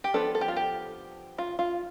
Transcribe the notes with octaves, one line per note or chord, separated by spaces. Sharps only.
G4
F3 B3 D4 A4
A4
G4
F4
G4
F4
F4